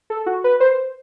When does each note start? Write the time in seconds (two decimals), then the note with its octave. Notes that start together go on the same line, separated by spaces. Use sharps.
0.10 A4
0.26 F#4
0.44 B4
0.60 C5